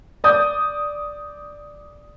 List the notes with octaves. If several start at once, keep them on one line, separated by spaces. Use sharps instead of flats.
D5 D#6 G6